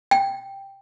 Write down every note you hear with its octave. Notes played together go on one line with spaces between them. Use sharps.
G5